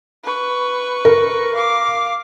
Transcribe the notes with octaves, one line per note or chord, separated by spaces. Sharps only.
B4 C#6
A#4
F5 D6